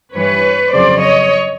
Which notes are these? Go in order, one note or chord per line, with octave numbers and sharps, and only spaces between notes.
G2 E3 G3 B4 C#5
F2 C#3 F#3 C5 D5
C#5 D#5